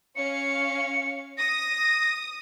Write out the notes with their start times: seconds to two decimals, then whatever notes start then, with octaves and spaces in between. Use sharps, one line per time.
0.16 C#4 F5 C#7
1.38 D#6 A#6